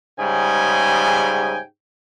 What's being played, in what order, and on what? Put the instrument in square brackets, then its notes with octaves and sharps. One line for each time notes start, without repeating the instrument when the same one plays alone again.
[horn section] G#2 C#3 G3 G5 G#5